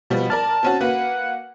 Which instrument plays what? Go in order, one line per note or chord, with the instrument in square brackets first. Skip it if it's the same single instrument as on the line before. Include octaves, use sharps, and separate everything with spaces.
[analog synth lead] B2 [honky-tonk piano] F3 G3 B3
[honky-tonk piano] A#4 D5 F6 [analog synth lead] A5
[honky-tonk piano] C4 C#4 F#4
[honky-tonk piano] A#3 F#4 B4 [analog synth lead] F#5